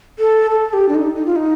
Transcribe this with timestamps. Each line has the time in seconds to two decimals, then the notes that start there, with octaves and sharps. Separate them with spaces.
0.19 A4
0.51 A4
0.73 G4
0.89 D4
0.95 D#4
1.15 D#4
1.26 F4
1.36 D#4